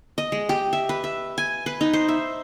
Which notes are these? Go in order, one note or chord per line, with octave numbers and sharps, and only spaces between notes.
D#5
G#3
G4
E5
B4
E5
G#5
B4
D#4
C5
E5